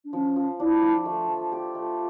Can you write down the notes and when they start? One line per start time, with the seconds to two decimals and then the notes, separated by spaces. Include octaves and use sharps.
0.04 D4
0.13 F3 C#4
0.36 F3
0.60 D4 E4
0.82 F3
1.06 A3 F4
1.29 F3
1.52 G4
1.75 A3